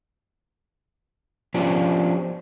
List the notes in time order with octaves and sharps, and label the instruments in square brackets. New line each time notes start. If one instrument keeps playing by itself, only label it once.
[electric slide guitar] F3 C#4 D4 F4 G4